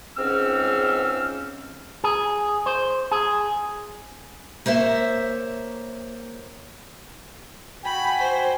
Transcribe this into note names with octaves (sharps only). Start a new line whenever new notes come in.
C#2 G#2 C4 C#4 E6 F6
G#4
C5
G#4
A#3 C5 C#5 E5
F#4 G5 G#5 B5
C5